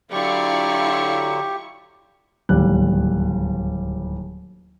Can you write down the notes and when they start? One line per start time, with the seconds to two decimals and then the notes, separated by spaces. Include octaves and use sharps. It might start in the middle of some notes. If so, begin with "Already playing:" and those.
0.12 D3 F#3 E4 F4 G4 D5 F5 C#6
2.49 D1 D#2 G3 F#6